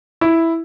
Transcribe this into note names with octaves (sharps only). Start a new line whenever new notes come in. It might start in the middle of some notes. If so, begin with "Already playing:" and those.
E4